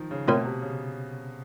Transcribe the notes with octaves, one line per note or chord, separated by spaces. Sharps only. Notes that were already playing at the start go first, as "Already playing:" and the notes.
Already playing: D#3 F3
C#3
B2 A3 C4 F4 A#4 C#5
C3
C#3